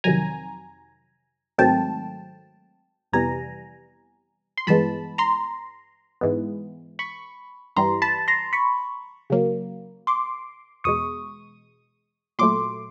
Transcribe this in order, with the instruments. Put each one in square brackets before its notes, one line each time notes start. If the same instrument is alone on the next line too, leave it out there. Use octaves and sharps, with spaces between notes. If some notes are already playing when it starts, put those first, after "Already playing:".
[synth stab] F2 C3 D#3 F#3 G#5 A#5
G#2 D#3 F#3 A3 C4 G5 A5
F2 C3 E3 G3 B3 G#5 A#5
C6
G2 E3 G#3 B3 A5 B5
A#5 C6
G#2 E3 G#3 B3
B5 C#6
G2 E3 G3 A#5 C6
A5 B5
A#5 C6
B5 C#6
C#3 F#3 A#3
C6 D6
E2 B2 G#3 C#6 D#6
A#2 F#3 A3 C6 D6